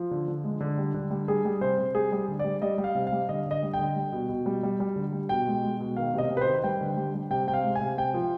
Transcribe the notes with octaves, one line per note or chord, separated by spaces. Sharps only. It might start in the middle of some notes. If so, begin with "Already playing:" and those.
Already playing: F3
D3
D3
G#3
D3
G3
D3
G3
G3 G#4
G3
C3 C5
C3
G3 G#4
G3
D3
D5
G3
G3 D#5
G3
F5
C3
F5
G3
D3 D#5
D3 D#5
G3
G5
D3
G3
B2
B2
G3
G3
G3
D3
G3
B2 G5
G#3
G#3
B2
D#3 F5
C3 D#5
C3
B4
C5
D#3
G3 G5
D3
G3
G3
C3 G5
C3 G5
F5
G#3
G#5
C3
C3 G5
F3